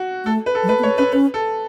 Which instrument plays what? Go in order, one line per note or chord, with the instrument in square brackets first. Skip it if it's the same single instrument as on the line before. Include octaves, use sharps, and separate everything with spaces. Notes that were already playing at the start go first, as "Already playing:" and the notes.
Already playing: [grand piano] F#4
[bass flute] A3 [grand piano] A4
[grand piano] B4
A4
[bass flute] F#3
[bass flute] A3 [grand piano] B4
[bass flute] B3
[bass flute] A3 [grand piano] C#5
[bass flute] C#4 [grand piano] B4
[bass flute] C#4 [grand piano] B4
[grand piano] A4